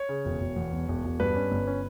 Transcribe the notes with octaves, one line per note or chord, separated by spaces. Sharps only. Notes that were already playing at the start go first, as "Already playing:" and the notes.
Already playing: C#5
C#3
E1
E1
E2
E1
E1
E1
G2 B4
C#4
G1
C#4